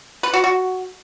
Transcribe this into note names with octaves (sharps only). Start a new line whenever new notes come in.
B4
F#4
F#4